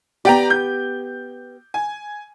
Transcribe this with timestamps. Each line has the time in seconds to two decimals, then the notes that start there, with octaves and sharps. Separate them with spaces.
0.25 B3 G4 D5 G5 A#5
0.50 G6
1.74 G#5